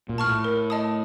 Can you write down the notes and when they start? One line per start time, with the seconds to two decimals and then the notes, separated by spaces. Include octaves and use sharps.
0.09 A#2
0.18 A5 C#6 F6
0.27 A2
0.44 A#4
0.70 D#5 A5 D#6